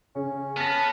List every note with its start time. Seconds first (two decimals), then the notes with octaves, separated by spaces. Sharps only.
0.15 C#3 C#4
0.57 B3 A5 F6 A#6